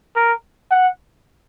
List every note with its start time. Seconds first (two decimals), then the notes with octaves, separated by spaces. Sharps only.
0.16 A#4
0.71 F#5